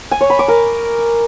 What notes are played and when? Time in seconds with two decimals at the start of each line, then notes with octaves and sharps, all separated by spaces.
0.11 G#5
0.21 C#5
0.30 B5
0.39 D6
0.48 A#4